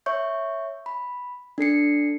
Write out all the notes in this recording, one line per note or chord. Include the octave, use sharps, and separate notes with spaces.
C#5 E5 C#6 G6
B5
D4 A4 C7 C#7